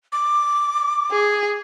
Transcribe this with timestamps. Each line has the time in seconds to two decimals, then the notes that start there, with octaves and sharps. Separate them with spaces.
0.12 D6
1.11 G#4